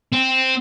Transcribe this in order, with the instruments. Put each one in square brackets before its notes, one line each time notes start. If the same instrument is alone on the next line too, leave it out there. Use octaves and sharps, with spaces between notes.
[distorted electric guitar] C4